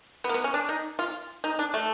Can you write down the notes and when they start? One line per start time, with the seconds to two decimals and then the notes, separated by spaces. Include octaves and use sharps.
0.24 B3
0.29 A#3
0.34 B3
0.44 C#4
0.54 D4
0.69 D#4
0.99 F4
1.44 D#4
1.59 D4
1.74 A3